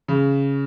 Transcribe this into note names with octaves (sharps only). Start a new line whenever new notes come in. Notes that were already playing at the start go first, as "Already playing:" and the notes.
C#3